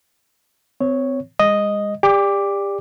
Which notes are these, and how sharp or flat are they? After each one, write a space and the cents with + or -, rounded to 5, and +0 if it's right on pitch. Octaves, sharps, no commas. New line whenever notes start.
C4 -30 C#5 +0
G#3 -35 D#5 +0
G4 +30 D5 +0 D6 +0